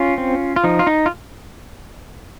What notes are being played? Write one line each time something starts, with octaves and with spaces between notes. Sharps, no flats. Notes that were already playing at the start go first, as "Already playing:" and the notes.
Already playing: C#4 F4
C4
F4
F3 D#4
F4
D#4
F4